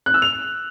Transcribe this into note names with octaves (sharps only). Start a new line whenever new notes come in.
F#6
E6
F7